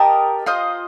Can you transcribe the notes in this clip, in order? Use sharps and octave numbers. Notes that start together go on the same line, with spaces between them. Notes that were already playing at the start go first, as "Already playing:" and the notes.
Already playing: G4 A#4 D#5 A5
F4 C5 D#5